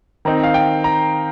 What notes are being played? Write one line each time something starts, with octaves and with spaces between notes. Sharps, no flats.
D#3 C4 D#4 A#5
F5
G5
A#5